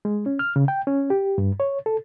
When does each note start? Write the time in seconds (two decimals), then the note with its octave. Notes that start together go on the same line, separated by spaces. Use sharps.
0.05 G#3
0.26 C#4
0.39 F6
0.56 C#3
0.68 G5
0.87 C#4
1.10 G4
1.38 G2
1.60 C#5
1.86 A4